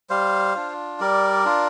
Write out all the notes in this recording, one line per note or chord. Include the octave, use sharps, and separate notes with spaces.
G3 C5 F5
D4 F4
G3 A#4 D5
D4 F4